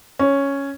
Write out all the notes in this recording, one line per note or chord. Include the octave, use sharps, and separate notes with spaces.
C#4